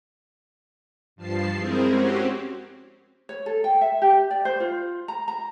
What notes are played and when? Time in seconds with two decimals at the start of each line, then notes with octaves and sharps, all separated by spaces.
1.16 G2 F3 A5 C7
1.56 G#3 C4 E4 G#4 A#4 C5
1.87 C4 C#4 F#4 G4 C5
3.29 C#5
3.46 A4
3.64 G5
3.81 E5
4.02 G4
4.31 D5
4.45 C5
4.60 F4
5.08 A#5
5.28 A#5